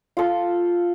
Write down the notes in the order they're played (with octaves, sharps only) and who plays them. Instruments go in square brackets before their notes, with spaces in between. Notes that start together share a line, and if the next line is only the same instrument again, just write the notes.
[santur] F4 A4